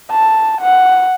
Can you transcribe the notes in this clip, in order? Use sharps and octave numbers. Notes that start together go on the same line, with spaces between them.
A5
F#5